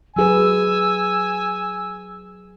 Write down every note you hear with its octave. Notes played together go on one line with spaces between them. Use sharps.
F#3 G#4 B4 G#5 E6